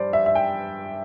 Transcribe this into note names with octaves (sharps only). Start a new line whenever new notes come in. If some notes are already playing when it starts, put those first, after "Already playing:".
Already playing: G2 C5 D5
E5
E5
G5